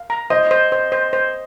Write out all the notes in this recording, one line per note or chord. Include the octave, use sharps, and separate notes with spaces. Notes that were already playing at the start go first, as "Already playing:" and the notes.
Already playing: F5
A#5
C5 D#5
C5
C5
C5
C5